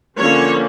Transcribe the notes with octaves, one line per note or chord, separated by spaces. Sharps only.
D3 F3 A#3 C#4 C#5